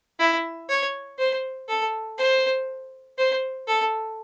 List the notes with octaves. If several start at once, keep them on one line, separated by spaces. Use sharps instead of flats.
E4
C#5
C5
A4
C5
C5
A4